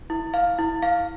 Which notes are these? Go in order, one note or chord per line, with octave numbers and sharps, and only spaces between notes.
E4
F5
E4
F5